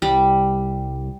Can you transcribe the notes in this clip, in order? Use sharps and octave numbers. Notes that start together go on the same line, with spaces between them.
C2 G3